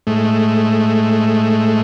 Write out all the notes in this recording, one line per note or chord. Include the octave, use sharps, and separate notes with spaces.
A2 G#3 A3